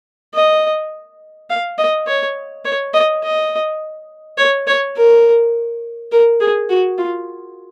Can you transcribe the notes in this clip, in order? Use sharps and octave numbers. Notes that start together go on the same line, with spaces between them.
D#5
F5
D#5
C#5
C#5
D#5
D#5
C#5
C#5
A#4
A#4
G#4
F#4
F4